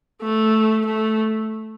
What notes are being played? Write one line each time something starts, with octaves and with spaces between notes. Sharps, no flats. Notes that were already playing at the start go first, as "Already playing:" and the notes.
A3
A3